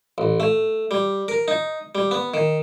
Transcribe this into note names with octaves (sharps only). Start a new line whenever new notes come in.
A1
A3
G3
A#4
D#4
G3
B3
D#3